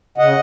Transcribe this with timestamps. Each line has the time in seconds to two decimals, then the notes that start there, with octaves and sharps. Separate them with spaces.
0.18 C#3 D#5 F#5